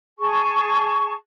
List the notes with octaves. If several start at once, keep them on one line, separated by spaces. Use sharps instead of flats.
G#4 A5 C#6